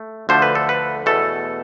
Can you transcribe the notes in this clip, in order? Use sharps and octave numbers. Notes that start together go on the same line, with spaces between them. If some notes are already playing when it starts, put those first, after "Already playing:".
Already playing: A3
D2 D3 F3 A3 C5
B4
A4
B4
E2 B2 A3 A4